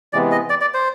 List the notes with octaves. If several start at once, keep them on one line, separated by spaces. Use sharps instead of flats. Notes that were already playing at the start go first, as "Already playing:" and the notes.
C3 E3 G#3 B3 D5
D#5
D5
D5
C5